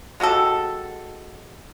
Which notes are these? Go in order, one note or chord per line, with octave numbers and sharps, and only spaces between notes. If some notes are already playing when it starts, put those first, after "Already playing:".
G#3 F#4 G4 A4